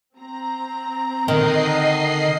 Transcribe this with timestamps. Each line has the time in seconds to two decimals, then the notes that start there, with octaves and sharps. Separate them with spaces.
0.17 C4 A#5
1.28 D3 D#3 D#5 C7